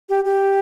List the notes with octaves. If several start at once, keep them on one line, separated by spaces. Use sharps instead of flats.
G4
G4